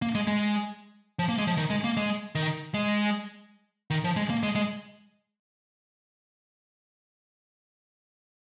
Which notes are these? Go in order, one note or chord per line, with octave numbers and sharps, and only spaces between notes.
A#3
G#3
G#3
F3
A#3
G#3
F3
D#3
G#3
A#3
G#3
D#3
G#3
D#3
F3
G#3
A#3
G#3
G#3